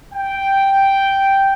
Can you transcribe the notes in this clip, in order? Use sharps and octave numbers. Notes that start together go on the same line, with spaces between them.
G5